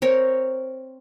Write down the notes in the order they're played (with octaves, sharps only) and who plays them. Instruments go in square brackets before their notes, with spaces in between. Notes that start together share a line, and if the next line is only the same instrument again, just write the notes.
[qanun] C4 A#4 C#5